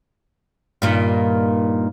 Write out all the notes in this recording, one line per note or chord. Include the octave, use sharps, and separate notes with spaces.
G2 A#2 D#3